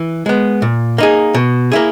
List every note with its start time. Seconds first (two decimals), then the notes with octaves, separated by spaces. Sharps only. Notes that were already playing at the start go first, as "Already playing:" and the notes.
Already playing: E3
0.26 G#3 B3
0.62 A#2
0.98 A#3 D#4 G#4
1.35 B2
1.72 A#3 E4 G#4